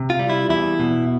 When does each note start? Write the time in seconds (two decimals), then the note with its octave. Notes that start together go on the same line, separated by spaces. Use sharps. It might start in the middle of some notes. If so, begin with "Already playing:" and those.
Already playing: C3
0.10 F4
0.19 G3
0.30 E4
0.49 E2 E4
0.80 B2